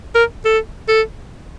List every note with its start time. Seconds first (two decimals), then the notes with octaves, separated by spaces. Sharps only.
0.15 A#4
0.45 A4
0.88 A4